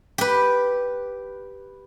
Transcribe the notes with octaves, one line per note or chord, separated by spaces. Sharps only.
G4 B4